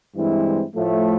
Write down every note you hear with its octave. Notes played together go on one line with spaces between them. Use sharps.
G2 E3 G#3 C4 E4
A2 F3 A3